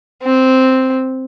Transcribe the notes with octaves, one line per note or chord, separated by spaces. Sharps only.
C4